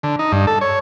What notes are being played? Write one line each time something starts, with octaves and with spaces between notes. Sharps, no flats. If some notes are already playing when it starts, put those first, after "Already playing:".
D3
D#4
G2
A4
C#5